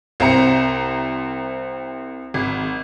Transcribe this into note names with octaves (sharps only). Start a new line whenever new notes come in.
C2 C4 C5 A#5 C#7
G#1